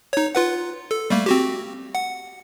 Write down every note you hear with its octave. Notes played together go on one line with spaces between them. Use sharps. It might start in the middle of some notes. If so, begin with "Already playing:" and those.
D#4 C#5
F4 B4 F#5
A4
G3 A3 A#3
C4 F#4 G4
F#5